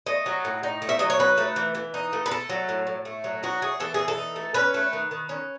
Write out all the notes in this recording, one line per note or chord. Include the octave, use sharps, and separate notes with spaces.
A3 D#5
F#3
A2
D#4
A3
E5
F#3 D#5
C#5
D#4 B4
A3
E3
E3
D#4
A3
B4
A3 A4
F#3
A2
A2
A3
F#3
D#4 F#4
A3 G#4
E3 A4
E3 G#4
A4
D#4
A3
C#4 B4
A3
D#3
D#3
C#4